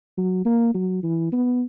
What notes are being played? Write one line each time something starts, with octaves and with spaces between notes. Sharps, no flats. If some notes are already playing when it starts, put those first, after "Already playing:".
F#3
A#3
F#3
E3
B3